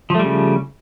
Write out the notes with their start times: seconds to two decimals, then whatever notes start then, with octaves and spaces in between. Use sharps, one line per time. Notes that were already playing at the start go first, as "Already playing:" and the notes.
0.10 F3
0.15 A3
0.19 G3
0.24 C#3